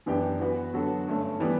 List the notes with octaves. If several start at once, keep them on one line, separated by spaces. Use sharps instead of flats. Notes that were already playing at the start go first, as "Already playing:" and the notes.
F#2 E3 B3 D4 G4
E3 B3 F#4 B4
D3 F#3 B3 F#4 A4
G2 D3 A3 C#4
E3 G3 B3